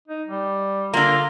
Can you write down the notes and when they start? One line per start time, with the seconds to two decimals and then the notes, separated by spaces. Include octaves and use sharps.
0.08 D#4
0.27 G3
0.94 D3 A#3 F4